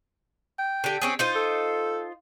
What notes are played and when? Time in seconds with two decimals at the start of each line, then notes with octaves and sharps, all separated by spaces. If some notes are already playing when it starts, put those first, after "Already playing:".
0.59 G5
0.84 D3 G4
1.02 C4 C#4 G#4
1.19 D#4 F4 C5
1.35 A4